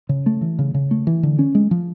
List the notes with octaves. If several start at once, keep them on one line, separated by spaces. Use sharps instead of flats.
C#3
A3
E3
C#3
C#3
A3
E3
D3
C#4
G#3
F3